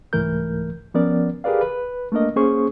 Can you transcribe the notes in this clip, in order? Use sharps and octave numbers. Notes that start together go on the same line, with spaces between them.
C2 G#2 E3 A3 A#4 G6
F3 B3 C#4 A#4 D5
G4 G#4 A#4 B4 D5 F5
B4
A3 A#3 D4 A#4 D#5
A#3 C#4 G#4 C5 C#6